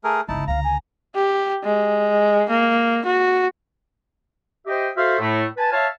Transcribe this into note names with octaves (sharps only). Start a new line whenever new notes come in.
A3 G#4 A#4
G1 C#2 D#4 E4 A5
C#2 D3 F5 A#5
G#5
G4
G#3
A#3
F#4
G4 C5 D#5 E5 G5
F#4 A4 C5 E5 F5
A2 A3
B4 G#5 A5
C#5 E5 F5 A5